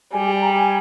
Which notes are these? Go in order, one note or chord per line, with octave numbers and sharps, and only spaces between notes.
G3 G#5
G#5
A#5
G#5